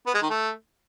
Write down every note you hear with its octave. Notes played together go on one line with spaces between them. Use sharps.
B3
G#3
D#3
A3